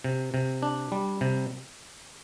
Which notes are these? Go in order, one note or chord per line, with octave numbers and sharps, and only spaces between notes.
C3
C3
D4
G3
C3